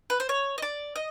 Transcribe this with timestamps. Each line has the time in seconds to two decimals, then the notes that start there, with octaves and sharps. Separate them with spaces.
0.10 B4
0.20 C5
0.29 C#5
0.58 D#5
0.62 D5
0.96 D#5